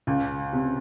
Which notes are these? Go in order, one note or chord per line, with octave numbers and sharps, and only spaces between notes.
C#2
C3